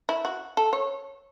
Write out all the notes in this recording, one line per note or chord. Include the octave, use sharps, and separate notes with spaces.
E4
F#4
A4
C#5